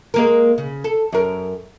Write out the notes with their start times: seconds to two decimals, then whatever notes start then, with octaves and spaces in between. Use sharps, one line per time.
0.14 G#3 A#3 A#4
0.58 C#3
0.84 A4
1.12 F#2 A#4